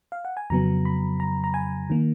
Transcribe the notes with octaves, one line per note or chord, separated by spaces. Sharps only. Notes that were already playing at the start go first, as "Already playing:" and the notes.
F5
F#5
G#5
F2 C#3 F#3 B3 A#5
B5
A#5
A#5
G#5
D#3 A#3